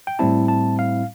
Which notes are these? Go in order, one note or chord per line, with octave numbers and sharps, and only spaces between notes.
G5
A2 G3 C4 E4 A5
A5
F5